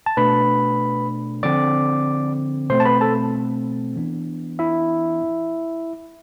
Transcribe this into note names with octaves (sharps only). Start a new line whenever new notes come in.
A5
B2 A3 D4 B4 B5
D3 F3 C4 D5 D6
B2 A3 C4 C5 C6
A5
B4 B5
A4 A5
E3 B3 D4
E4 E5